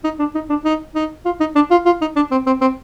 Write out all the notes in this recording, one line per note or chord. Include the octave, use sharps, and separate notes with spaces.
D#4
D4
D#4
D4
D#4
D#4
F4
D#4
D4
F4
F4
D#4
D4
C4
C4
C4